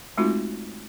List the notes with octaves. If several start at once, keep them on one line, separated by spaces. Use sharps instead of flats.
G#3 A3 C4 D#4 F4 F#4